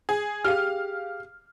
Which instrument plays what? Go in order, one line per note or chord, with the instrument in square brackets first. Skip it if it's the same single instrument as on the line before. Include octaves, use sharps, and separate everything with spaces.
[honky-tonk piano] G#4
[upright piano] G4 G#4 [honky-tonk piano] F5 F6